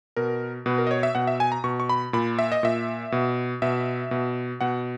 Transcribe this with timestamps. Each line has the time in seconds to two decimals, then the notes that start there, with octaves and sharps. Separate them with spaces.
0.16 B2 A#4
0.66 B2 B4
0.78 A#4
0.87 D#5
0.91 C#5
1.03 E5
1.15 B2 F#5
1.27 E5
1.40 G#5
1.52 A#5
1.64 B2 C#6
1.80 C#6
1.89 B5
2.13 A#2 B5
2.39 E5
2.52 D#5
2.63 A#2 E5
3.12 B2
3.62 B2 E5
4.11 B2
4.61 B2 F#5